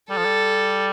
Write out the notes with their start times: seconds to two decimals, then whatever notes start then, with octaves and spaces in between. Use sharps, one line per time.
0.10 G3 A4
0.18 F3
0.25 G3